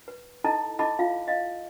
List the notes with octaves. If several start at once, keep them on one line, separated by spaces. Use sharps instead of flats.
B4
D#4 E4 A4 D#5 A5 A#5
E4 A4 D#5 A5 B5 D6
F4 E5 F5
D#5 F5